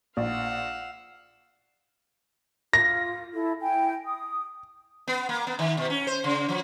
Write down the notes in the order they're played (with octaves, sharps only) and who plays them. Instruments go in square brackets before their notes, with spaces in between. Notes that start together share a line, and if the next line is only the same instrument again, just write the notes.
[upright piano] A#1 [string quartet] F5 F#5 E6
[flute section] F4 [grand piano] A#6
[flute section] E4 A4
E4 G5 G#5
D#6
[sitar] B3
A#3
B3
D#3
B2
C#4
C5
C#3
F3